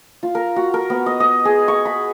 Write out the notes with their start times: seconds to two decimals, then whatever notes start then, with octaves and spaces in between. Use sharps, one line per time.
0.23 F4
0.35 A#4
0.56 F#4
0.74 A#4
0.90 B3
1.06 D#5
1.20 D#5
1.45 G#4
1.68 C#6
1.85 B5